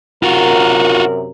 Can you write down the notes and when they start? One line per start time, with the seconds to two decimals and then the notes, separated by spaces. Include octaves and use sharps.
0.23 F#2 C3 F4 F#4 A#4